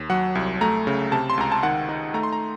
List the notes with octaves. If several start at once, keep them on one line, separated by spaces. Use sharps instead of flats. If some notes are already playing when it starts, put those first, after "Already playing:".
Already playing: D#2
F#3 F#5
C2
A3 A#5
C#3
C3 A5
C6
C#2 A#5
A5
D#3 F#5
D#4
A3 A#5
C6
A#5